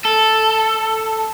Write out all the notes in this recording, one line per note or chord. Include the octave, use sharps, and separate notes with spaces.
A4